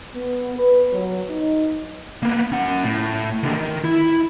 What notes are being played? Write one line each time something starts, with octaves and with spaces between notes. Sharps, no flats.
B3
B4
F#3
D#4
A#3 B3
C#4 F#5
A2
D#2 D3
D#3
E4